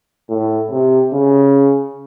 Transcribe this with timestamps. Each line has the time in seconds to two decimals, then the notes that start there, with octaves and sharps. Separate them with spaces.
0.30 A2
0.71 C3
1.13 C#3